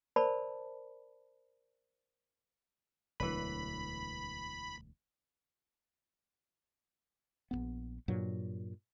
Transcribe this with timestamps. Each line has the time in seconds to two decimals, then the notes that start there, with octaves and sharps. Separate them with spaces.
0.16 A#4 C5 D5 A5 B5
3.20 E1 D2 E3 F#3 B4 B5
7.51 A#1 E2 B3
8.08 G2 A#2 F#3